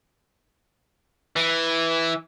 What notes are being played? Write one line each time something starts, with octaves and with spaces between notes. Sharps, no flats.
E3